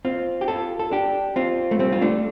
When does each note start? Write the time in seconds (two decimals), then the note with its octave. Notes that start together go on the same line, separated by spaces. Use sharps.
0.05 C4 F4
0.41 G4
0.48 F4 A4
0.79 A4
0.91 D4 G4
1.36 C4 F4
1.71 A3
1.79 G3 C4
1.92 F4
2.01 A3 D4